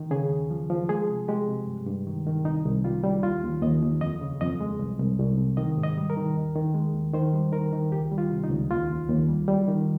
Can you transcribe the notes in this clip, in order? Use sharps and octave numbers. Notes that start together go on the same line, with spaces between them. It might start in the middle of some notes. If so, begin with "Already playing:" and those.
Already playing: D#3
C#3 G#4
D#2
F3
F3
G#3 G#4
C3
G#3 G4
C3
G2
G2
D#3
D#3
C2 D#4
C2
G3 F4
G3
D#2 F4
D#2
D#2 D#5
D#2
F2 D#5
C#3
F2 D#5
G#3
C2
C2
C2
C3
D#3 D#5
G#2
D#5
G3
A#4
D#3
D#2
D#3
G#3
D#2
D#3 C5
G3
D#3 A#4
D#3
C#2 G4
G3
F4
C3
D#4
C#2
D#2 F4
D#2
D#2
G3
G3
D#3